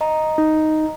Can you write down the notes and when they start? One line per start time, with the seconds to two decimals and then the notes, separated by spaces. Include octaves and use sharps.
0.01 D#5 A#5
0.38 D#4